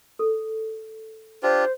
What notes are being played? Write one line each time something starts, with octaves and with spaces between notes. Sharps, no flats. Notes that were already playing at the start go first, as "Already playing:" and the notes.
A4
D4 F4 G4 C5